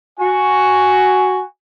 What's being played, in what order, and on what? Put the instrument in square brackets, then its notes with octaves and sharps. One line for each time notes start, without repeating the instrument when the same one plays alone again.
[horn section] F#4 [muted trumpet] G#5